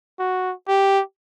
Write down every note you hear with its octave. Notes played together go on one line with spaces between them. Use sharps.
F#4
G4